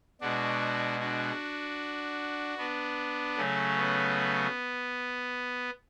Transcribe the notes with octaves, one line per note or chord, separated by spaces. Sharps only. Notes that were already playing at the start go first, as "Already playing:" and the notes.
B2 G#3 D4 F#4
D4 F#4
B3 D4
C#3 F#3 A3 C#4
B3